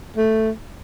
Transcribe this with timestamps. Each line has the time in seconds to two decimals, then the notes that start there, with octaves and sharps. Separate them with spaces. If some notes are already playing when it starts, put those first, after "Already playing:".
0.17 A3